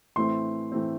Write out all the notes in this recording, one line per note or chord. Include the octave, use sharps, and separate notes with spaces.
A2 E3 A3 C4 C6
A2 E3 A3 C4